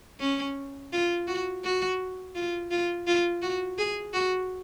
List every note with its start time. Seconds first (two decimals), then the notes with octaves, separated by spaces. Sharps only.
0.20 C#4
0.93 F4
1.27 F#4
1.64 F#4
2.35 F4
2.71 F4
3.07 F4
3.42 F#4
3.78 G#4
4.14 F#4